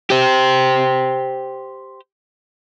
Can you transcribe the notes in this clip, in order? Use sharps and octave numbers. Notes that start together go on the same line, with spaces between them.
G4 C5